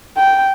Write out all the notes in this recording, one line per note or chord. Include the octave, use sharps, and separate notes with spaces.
G5